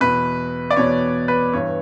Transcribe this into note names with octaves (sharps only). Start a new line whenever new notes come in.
E2 B2 B4
D5
E2 B2 C#5
B4
G2 E3 C#5